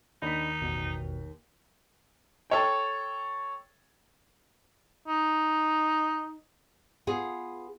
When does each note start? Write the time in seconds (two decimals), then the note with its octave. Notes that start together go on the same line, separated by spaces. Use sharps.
0.22 D#2 D4 D#4 D#5 B5 B6
0.62 A1 E2 B2
2.50 A4 C#5 G5
5.08 D#4
7.07 B3 F4 G#4